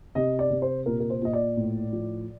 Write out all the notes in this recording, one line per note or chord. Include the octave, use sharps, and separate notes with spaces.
C3 D#5
D5
C3
C5
A#2 A#4
A#4
C5
A#2 D#5
D5
A2
F3